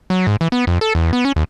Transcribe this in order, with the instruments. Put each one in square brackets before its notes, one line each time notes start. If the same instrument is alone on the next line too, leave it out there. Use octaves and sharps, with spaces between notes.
[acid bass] F#3
G#2
E3
B3
F2
A4
E2
B3
C#4
D#2